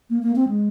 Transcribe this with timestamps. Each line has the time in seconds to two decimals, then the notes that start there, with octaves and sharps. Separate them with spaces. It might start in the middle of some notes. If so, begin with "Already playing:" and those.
0.10 A#3
0.23 A#3
0.36 C4
0.49 G#3